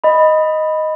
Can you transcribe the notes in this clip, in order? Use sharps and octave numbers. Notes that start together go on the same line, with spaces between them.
D#5 B5